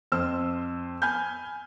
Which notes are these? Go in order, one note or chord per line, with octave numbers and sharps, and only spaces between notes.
F2 C5 E6
G#5 B5 F6 G6